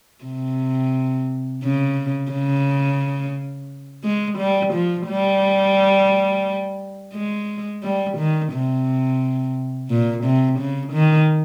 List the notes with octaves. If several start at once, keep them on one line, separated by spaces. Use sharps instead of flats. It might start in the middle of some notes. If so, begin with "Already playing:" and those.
C3
C#3
C#3
G#3
G3
F3
G3
G#3
G3
D#3
C3
A#2
C3
C#3
D#3